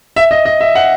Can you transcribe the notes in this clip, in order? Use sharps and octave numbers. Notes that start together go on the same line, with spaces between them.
E5
D#5
D#5
E5
F#5